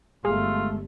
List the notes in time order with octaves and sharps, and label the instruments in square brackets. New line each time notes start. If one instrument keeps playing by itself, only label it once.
[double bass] G1 [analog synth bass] G#3 [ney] A3 [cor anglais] F4